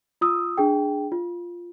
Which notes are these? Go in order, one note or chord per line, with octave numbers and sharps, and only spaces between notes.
F4 D#6 E6
D4 G#4 G5
F4